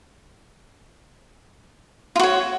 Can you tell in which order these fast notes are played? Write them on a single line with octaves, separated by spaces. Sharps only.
F4 F#4 C#5